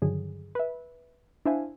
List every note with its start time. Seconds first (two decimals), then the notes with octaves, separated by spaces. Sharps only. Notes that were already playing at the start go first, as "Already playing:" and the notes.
0.02 G2 D3 D#3 F#3 G#4
0.55 B4 E5
1.45 D4 E4 C5 E5 F5 G#5